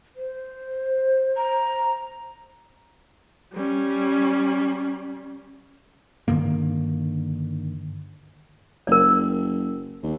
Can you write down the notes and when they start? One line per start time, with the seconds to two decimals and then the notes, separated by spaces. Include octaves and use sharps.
0.16 C5
1.37 A#5
3.53 G3 C#4
6.28 G2 D3 D#3 A#3
8.87 F#1 A#4 D5
10.03 D#2